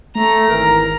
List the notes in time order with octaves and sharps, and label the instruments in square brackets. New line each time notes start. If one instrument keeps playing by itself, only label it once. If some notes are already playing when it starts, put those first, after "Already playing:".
[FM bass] A3 [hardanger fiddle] A#5
[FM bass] G#1 [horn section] E3 A#4